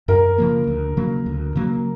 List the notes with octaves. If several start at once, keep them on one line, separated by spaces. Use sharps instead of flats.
F#2 A#4
C#3 F3 A#3
D2
C#3 F#3 A#3
D2
C#3 F#3 A#3